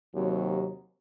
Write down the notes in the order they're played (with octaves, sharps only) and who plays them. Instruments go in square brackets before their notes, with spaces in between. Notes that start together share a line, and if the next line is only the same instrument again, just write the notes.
[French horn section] D#2 C3 F#3